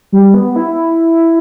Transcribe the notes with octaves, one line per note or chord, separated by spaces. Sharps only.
G3
B3
E4